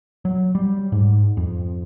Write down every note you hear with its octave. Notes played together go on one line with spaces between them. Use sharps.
F#3
G3
G#2
F2